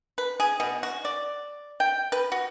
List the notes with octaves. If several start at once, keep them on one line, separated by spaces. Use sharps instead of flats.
B4
G#4
B2
F#4
D5
G5
B4
F#4